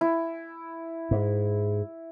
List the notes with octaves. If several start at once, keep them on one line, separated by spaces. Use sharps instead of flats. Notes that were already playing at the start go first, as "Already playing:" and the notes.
E4
G#2